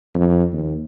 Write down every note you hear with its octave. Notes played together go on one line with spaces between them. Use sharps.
F2
D#2